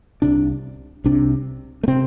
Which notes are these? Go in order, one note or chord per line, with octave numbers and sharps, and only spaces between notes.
C2 C3 D4
C2 C3 D4
A3
C3 C4